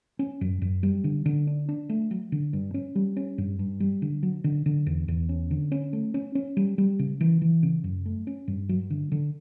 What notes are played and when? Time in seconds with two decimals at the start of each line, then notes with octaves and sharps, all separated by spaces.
0.19 C#4
0.41 F#2
0.62 F#2
0.83 G3
1.04 D3
1.26 D3
1.47 D4
1.69 D4
1.89 A3
2.11 F#3
2.32 D3
2.53 G2
2.74 C#4
2.95 G3
3.17 C#4
3.38 G2
3.59 G2
3.80 G3
4.02 D3
4.23 F#3
4.44 D3
4.66 D3
4.87 E2
5.08 E2
5.29 C#4
5.51 D3
5.72 C#4
5.93 A3
6.14 C#4
6.35 C#4
6.57 G3
6.78 G3
6.99 C#3
7.21 E3
7.42 E3
7.63 C#3
7.84 F#2
8.06 A3
8.27 C#4
8.48 G2
8.69 F#3
8.90 D3
9.12 D3